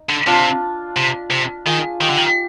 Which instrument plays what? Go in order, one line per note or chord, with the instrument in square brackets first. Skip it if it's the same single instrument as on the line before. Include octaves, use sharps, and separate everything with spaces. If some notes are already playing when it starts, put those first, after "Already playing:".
Already playing: [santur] D#4
[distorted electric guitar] D3
[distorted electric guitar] C3 [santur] D4 F4
[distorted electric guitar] C3
C3
[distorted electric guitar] D#3 [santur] F4 G#4
[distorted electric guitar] D#3 [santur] D#4 G4
[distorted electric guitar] D3
D#3